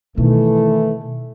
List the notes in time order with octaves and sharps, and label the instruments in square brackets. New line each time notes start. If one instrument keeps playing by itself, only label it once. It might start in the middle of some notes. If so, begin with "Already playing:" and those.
[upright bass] B2 [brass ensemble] D#3 E3 A3